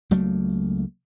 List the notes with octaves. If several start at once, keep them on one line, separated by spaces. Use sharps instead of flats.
C#2 F#3 A3 A#3